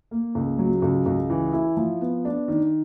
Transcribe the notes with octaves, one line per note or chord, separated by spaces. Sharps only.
A#3
C#2
F#3
C#2
C#2
E3
E4
F3
B3
D4
D#3